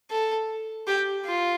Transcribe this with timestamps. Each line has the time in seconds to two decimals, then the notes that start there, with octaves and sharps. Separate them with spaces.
0.10 A4
0.87 G4
1.25 F4